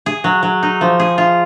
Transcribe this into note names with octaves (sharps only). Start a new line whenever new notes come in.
G#4
F#3
F#3
D#4
F3
G#4
F4